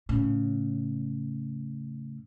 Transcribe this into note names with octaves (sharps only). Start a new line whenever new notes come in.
A2 C#3